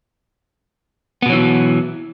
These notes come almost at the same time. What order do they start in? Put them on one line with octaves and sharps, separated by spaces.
B3 B2 F#3 E3